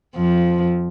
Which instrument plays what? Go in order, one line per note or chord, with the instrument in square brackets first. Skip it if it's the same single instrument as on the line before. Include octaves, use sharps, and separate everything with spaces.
[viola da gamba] F2 F3